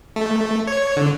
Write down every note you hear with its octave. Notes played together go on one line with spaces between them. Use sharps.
A3
C#5
D3